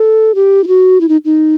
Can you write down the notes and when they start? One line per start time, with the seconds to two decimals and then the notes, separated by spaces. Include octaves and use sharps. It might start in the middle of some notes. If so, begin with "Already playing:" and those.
Already playing: A4
0.35 G4
0.64 E4
0.68 F#4
1.01 E4
1.09 D#4
1.25 D#4